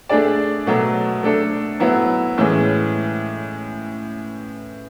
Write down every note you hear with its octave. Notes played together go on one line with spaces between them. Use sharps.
A3 D4 G#4 D5
B2 F#3 A3
A3 D4 A4
F#3 B3 E4
A2 E3 G#3 C#4